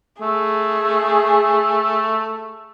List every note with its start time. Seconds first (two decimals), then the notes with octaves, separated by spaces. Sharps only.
0.21 A3 G#4